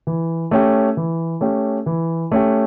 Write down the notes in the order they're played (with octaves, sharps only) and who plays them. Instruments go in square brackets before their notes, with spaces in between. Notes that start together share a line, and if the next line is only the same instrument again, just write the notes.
[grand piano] E3
A3 C#4 G4
E3
A3 C#4 G4
E3
A3 C#4 G4